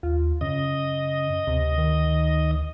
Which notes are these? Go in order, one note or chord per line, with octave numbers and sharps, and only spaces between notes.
D#2 F4
F#2 C#3 D#5
D2 C3
D#3